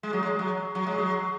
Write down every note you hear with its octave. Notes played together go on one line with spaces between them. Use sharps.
G#3
F#3
G#3
F#3
F#3
G#3
F#3